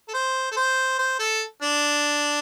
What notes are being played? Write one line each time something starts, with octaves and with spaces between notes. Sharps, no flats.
A4
C5
A4
C5
C5
A4
D4